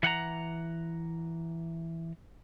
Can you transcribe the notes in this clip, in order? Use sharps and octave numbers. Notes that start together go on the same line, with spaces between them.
E3 F#5 G5 A#5